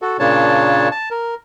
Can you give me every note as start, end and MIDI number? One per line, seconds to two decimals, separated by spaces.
0.02 0.17 66
0.02 0.17 69
0.19 0.89 46
0.19 0.89 49
0.19 0.89 58
0.19 0.89 62
0.19 0.89 73
0.19 0.89 81
0.91 1.09 81
1.11 1.34 70